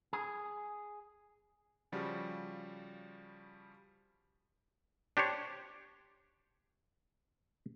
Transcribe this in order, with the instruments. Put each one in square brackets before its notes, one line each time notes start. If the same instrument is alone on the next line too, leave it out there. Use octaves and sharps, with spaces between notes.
[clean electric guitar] G#4
[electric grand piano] C#3 F3 G3 F#4
[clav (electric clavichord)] D4 G4 C5 C#5